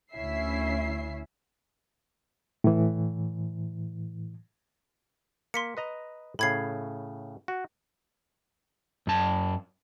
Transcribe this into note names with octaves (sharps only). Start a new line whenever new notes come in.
D2 C#4 E4 E5 C7
A2 E3
A#3 C6 B6 C#7
B4 D#5 A#5
A2 C#3 B5 G#6 C7
F#4
F#2 A5